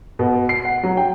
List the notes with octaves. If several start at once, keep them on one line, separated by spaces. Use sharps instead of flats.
B2
C7
F#5
F#3
G5